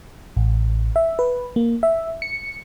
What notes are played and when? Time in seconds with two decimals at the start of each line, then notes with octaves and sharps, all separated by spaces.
0.36 A1
0.96 E5
1.19 B4
1.56 A#3
1.83 E5
2.22 C#7